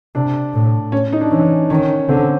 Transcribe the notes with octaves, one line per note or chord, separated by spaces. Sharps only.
C3 D4
A2
C#4
D#4
D4
E3 C#4
D#3 C#4
D3 C4